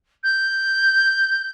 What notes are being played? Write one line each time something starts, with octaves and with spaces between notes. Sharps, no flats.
G6